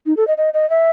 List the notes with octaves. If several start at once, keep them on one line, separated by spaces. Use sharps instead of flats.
D#4
A4
D#5
D#5
D#5
E5